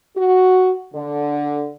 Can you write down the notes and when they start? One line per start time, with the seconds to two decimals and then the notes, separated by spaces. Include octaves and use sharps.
0.17 F#4
0.94 D3